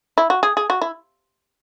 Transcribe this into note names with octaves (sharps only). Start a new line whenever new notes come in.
E4
F#4
G#4
G#4
F#4
E4